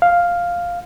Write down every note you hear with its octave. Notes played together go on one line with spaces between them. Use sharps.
F5